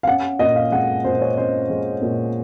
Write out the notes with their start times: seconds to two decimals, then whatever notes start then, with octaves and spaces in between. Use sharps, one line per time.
0.03 F5
0.07 C#4 F#5
0.39 A#2 D#5
0.56 F5
0.72 G#3 F#5
1.04 A#2 C5
1.21 C#5
1.36 C#4 C5
1.70 G#3
2.02 A#2